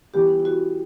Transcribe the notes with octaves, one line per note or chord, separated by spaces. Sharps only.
E3 G3 B3 G4
E4
F#4